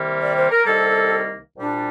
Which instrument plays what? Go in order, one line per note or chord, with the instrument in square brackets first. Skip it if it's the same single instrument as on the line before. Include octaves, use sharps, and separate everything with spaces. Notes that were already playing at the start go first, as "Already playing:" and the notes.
Already playing: [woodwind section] C2 C3 D#3 G3 A#3
D5
C5
A#4
C2 C3 D#3 G3 A#3 A4
C2 A#2 G3 D4